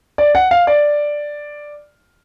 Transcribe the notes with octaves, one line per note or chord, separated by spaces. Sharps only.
D5
F#5
F5
D5